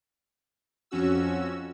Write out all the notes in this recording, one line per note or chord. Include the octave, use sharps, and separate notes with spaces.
F2 C#4 F#4 E6